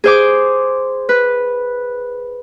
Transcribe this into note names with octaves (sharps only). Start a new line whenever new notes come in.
G#4 C5 D6
B4